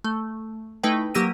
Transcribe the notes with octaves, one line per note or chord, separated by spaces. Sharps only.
A3
A3 D#4 E4 B4 G5
F#3 A#3 G4 E6 A#6 D#7